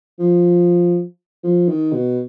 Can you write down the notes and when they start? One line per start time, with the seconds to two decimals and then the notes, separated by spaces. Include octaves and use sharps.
0.19 F3
1.44 F3
1.69 D#3
1.92 B2